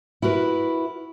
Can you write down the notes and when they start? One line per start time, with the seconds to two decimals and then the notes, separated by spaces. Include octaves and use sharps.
0.22 E4 F#4 A#4 B4